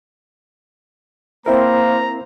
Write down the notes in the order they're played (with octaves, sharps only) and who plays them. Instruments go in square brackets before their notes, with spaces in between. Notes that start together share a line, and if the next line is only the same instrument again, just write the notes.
[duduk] A#3 [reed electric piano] C4 E4 A#4 [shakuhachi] C5 [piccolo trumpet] A#5